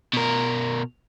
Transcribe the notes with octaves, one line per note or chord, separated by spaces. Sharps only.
B2 A#4